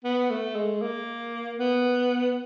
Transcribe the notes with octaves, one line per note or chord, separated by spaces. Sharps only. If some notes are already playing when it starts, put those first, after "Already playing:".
B3
A3
G#3
A#3
B3